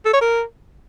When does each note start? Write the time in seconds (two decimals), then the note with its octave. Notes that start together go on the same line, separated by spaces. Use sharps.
0.05 A4
0.13 C#5
0.21 A#4